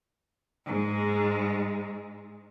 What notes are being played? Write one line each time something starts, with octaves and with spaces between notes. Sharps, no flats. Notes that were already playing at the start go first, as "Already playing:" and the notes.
G#2 G#3